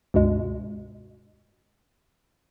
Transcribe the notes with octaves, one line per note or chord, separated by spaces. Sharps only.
C#2 G2 B2 G#3